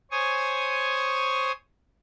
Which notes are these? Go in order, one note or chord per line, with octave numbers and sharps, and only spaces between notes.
C5 C#5 G#5 C#6 D#6